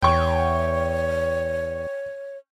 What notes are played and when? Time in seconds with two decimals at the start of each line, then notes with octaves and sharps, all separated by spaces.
0.02 E2 C#5 G5 C#6